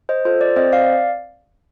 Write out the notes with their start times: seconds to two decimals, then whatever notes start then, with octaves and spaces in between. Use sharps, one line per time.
0.09 C5 D#5
0.25 F4 A4 C5
0.41 D5
0.56 C4 C5 D#5
0.72 D5 F5